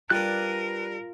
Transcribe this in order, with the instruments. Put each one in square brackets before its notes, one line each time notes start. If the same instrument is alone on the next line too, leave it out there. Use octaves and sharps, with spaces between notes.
[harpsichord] G3 D4 [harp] F4 [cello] A#4 [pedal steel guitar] B4 D5 F#6